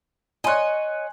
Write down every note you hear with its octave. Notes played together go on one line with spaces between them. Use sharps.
C#5 D#5 G#5 C6 F#6